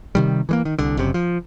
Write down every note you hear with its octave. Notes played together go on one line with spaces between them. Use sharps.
C3 D#3 G3
E3 G#3 A#3
D#3
C2 D3
F#1 F#2 C3
F3